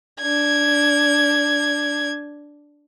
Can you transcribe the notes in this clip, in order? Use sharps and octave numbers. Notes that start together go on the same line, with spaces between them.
D4 G#6